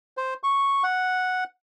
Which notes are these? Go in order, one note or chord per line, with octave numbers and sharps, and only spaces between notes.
C5
C#6
F#5